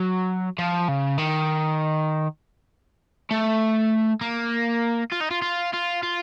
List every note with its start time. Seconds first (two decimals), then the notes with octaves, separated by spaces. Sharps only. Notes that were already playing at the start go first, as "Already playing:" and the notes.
Already playing: F#3
0.58 F3
0.88 C#3
1.18 D#3
3.31 A3
4.21 A#3
5.12 F4
5.21 D#4
5.31 F4
5.42 F4
5.73 F4
6.03 F4